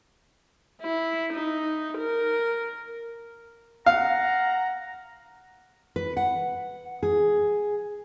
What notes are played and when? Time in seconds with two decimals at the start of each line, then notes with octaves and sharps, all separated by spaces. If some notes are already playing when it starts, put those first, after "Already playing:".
0.81 E4
1.33 D#4
1.98 A#4
3.86 F5 F#5 A#5
5.96 B4
6.17 F#5
7.03 G#4